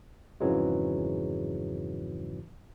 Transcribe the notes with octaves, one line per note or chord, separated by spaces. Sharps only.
F2 G#2 C#3 E3 F#3 G#3